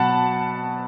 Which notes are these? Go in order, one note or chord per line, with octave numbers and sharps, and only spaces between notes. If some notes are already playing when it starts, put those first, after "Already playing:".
Already playing: B2 F#3 F#5 A5 B5